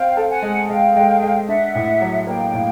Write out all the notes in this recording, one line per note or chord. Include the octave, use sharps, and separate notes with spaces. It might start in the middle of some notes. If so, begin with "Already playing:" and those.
Already playing: C4 F5 G5
A4
F#5 G#5
G#3
G#3 F5 G5
G#3
G#3
D4 E5 F#5
A2
F#3
A#3 F5 G5
A2